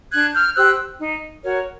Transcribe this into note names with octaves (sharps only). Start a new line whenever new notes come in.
D4 F#6 G#6
F6 G6
G4 C5 E6 F#6
D#4
F#4 A#4 C#5